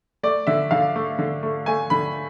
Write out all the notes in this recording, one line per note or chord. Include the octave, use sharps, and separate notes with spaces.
A3 D5
D3 E5
D3 F5
A3
D3
A3
A3 G#5
D3 B5